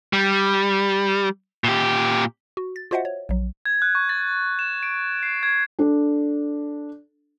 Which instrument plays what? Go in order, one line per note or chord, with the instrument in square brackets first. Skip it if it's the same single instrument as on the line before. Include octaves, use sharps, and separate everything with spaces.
[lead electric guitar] G3
A#2 G4
[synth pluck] F#4
A6
F4 F#4 C5 D#5 E5 F#5
C#5
A#1 F#3
[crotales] G#6
F#6
C#6
A6
E7
D7
C7
G#6
[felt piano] D4 A4